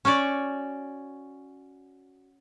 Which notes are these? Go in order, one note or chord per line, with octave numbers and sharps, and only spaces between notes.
C#4 F#4 C#5 D5